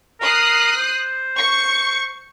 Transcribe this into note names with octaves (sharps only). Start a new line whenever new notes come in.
A#4 D#6 F#6 C7
C5
C#6 C#7